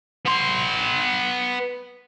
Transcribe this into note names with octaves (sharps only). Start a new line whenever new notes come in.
B3 C6